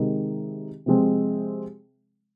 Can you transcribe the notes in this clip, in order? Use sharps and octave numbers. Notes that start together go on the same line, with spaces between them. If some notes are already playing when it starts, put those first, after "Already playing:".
Already playing: C3 D#3 G#3 D#4
C3 F3 G#3 C4